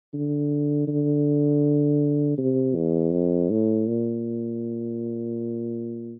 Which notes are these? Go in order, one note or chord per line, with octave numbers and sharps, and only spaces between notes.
D3
D3
C3
E2
F2
A2
A#2